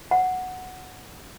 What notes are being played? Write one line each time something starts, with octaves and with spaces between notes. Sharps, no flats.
F#5